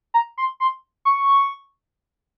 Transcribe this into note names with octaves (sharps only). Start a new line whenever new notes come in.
A#5
C6
C6
C#6